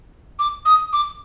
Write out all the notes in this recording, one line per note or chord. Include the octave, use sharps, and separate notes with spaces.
D6
D#6
D6